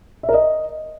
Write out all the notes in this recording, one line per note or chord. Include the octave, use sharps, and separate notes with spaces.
E5
A#4
D#5